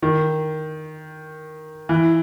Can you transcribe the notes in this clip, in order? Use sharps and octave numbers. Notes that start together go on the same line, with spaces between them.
D#3
E3